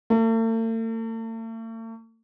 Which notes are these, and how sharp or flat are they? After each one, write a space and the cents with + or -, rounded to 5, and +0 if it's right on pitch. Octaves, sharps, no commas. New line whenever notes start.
A3 +45